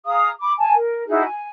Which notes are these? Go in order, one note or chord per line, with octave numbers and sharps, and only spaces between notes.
G#4 F5 A#5 D#6
B5 D6
G#5 A5
A#4
D#4 E4 F#4 G#4
G#5